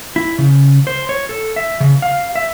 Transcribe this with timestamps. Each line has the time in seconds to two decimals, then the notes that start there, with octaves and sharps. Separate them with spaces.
0.16 E4
0.38 C#3
0.87 C5
1.09 C#5
1.29 A4
1.56 E5
1.80 C#3
2.02 F5
2.36 E5